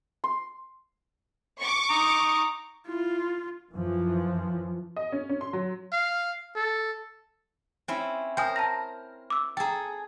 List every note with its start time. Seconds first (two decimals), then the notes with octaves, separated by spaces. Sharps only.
0.24 C6
1.60 C#6 D6
1.90 A#5 D#6
2.87 E4 F4
3.73 F#2 E3 F3
4.96 D#5
5.12 C#4
5.29 C#4
5.41 C6
5.53 F#3
5.92 F5
6.55 A4
7.88 C4 C#4 E4
8.37 A#4 C5 G5 G#5 D#6
8.56 A5 A#5 A#6
9.30 D6 E6
9.57 G#4 A4 G5 A#5